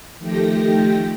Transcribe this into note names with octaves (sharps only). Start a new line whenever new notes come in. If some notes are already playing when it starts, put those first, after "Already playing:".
D#3 F3 A3 G4 G5 A#6